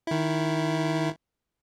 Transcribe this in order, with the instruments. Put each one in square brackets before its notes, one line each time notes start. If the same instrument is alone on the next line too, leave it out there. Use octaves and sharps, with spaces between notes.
[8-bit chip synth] D#3 E4